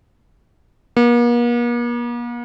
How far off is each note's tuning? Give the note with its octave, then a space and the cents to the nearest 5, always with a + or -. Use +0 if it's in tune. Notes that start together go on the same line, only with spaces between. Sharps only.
A#3 +45